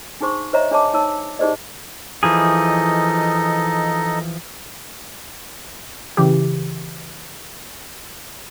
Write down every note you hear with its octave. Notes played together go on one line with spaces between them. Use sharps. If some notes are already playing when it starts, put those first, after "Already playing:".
D4 D#4 G#4 C5 C6 C#6
C5 C#5 D#5 E5 A#5
D4 G#4 C#5 D#5 A5 D6
D#4 C#5 A5 E6
D#4 G4 G#4 C5 D5 D#5
E3 F3 D#4 G#4 A4 D#5
C#3 E3 G4